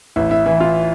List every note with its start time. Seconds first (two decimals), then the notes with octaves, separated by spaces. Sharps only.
0.16 A1 E4
0.31 E4
0.46 E3 E4
0.60 F4